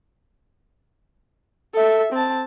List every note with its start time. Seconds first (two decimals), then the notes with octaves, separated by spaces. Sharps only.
1.74 A4 E5
2.13 C4 A5